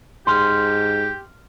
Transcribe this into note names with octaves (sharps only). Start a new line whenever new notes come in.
G#2 G4 C6 F6